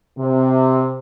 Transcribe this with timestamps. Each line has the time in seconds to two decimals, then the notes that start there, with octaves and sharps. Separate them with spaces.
0.19 C3